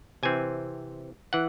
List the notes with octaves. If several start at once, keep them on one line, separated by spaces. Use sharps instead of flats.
C3 E3 C4 G#5
E3 F#5